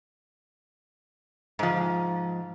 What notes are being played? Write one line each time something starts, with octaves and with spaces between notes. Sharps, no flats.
G#2 F3